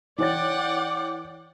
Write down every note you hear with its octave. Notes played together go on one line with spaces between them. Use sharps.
E3 C#5 D5 F#5 G5 D6 A6